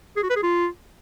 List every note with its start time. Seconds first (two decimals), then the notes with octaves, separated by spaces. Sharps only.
0.17 G#4
0.23 F#4
0.30 B4
0.36 G#4
0.43 F4